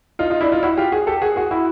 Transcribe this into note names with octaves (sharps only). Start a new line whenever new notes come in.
D#4 F4
D#4 F4
D4 E4
D#4 F4
E4 F#4
F4 G4
F#4 G#4
G4 A4
F#4 G#4
F#4 G#4
E4 F#4